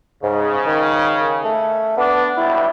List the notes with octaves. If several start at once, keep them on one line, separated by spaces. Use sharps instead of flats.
G#2 C#3
D#3
A3
B3 D4
B1 A2 G3 E4